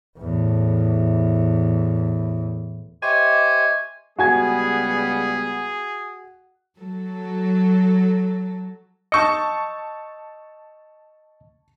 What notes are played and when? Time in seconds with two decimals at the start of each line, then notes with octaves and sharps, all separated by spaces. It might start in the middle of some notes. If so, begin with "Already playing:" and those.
0.19 E2 A2
3.02 G4 C5 C#5 D#5 E5 G#5
4.19 C#2 G3 B3 F#4 G#4 G#5 G#6
6.79 F#3 A4
9.12 D#5 A5 C#6 E6 G6 C#7